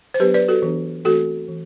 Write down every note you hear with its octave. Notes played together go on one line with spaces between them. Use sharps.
C5
F#3 B3 D4 G4 B4
B4 D5
F#4 A4
E3 B3 D4
E3 A3 C4 F#4 A4
E3